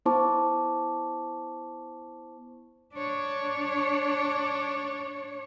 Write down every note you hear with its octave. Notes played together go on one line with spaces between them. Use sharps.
B3 E4 C5 A5 C#6 D6
D4 C#5